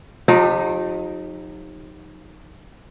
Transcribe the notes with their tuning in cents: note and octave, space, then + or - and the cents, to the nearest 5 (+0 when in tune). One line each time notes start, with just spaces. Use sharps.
F3 +45 D#4 +0 G4 +30